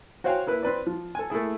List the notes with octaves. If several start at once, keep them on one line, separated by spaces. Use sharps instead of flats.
F#4 C5 C#5 F5 G5 G#5
A#3 E4 B4
C4 B4 D5
F3
A4 G#5
A3 A#3 E4 G#4